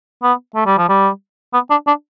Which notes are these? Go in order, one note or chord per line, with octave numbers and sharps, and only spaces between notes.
B3
A3
G3
F3
G3
B3
D4
D4